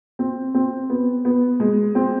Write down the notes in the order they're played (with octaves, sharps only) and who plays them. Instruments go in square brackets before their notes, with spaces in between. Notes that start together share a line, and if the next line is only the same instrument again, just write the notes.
[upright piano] C4
C4
B3
B3
G#3
C4